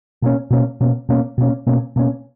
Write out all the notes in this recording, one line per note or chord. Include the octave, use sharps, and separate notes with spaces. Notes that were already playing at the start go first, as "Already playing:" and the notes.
B2 A#3 C#4
B2 A#3 C#4
B2 A#3 C#4
B2 A#3 C#4
B2 A#3 C#4
B2 A#3 C#4
B2 A#3 C#4